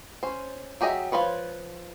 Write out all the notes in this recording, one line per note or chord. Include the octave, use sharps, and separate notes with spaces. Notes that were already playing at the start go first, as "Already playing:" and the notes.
C#4 C5
F#3 G4 G#4 D#5 E5
F3 C#4 F4 B4 C#5